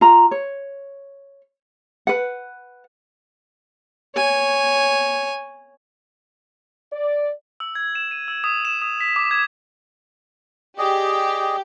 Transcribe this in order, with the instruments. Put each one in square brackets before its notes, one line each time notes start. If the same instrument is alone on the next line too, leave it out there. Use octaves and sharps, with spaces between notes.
[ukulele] F4 A#5
C#5
B4 F#5
[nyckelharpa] C#5 G#5
[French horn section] D5
[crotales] E6
G#6
E7
D#7
E6
D#6
E7
D#6
B6
D6
G#6
[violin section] G4 [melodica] G#4 D5 D#5